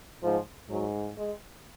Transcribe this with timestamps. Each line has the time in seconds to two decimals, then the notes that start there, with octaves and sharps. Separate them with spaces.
0.23 G#2 F3
0.70 G#2 F#3
1.18 G#3